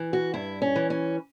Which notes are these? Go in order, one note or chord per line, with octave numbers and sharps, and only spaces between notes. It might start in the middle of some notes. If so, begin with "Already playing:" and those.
Already playing: E3
F#4
G2 E4
C#4
E3
C#4